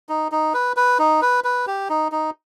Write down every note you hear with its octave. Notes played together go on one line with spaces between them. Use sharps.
D#4
D#4
B4
B4
D#4
B4
B4
G4
D#4
D#4